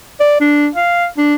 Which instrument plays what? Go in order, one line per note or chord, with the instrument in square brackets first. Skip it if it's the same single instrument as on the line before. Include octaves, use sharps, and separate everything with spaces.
[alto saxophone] D5
D4
F5
D4